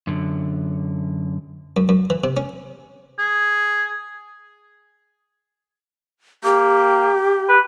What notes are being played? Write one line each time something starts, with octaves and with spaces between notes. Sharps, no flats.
F#2 D3
F#2
F#2
E3
C3
C#4
G#4
A#3 G4
B4